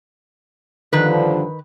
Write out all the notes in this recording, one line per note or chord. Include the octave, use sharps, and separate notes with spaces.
G2 D3 D#3 F3 B4